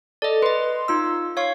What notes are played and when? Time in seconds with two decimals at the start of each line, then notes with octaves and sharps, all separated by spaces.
0.22 A4 D5 D#5
0.42 B4 D#5 C6
0.88 D#4 F4 E6
1.37 C#5 F5 C#6